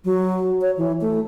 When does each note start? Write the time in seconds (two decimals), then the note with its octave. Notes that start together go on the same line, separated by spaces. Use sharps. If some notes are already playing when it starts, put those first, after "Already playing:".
0.05 F#3
0.61 C#5
0.77 E3
1.01 A3